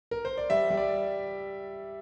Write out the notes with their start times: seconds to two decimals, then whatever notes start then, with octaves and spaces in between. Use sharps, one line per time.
0.11 A#4
0.25 C5
0.38 D5
0.50 G3 E5
0.70 G3
0.77 D5